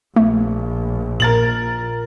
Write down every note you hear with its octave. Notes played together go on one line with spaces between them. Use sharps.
A#1 A3
A#2 A#4 A6 F#7